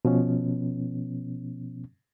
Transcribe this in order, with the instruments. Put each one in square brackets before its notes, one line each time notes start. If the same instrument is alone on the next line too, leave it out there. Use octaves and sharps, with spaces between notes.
[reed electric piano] B2 F3 B3 C#4